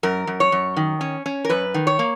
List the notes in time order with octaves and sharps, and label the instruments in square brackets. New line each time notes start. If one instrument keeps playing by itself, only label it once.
[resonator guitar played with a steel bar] F#2 A#4
F#2
C#5
F#2
D#3
C#4
C#4
A#4
F#2 B4
D#3
C#5
A#3